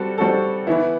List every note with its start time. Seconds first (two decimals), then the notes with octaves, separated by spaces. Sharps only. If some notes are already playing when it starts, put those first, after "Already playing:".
Already playing: G3 C4 F#4 A4
0.18 G3 C4 F#4 A4
0.67 E3 B3 E4